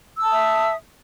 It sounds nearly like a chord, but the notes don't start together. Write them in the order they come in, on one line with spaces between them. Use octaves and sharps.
E6 A5 D#6 E5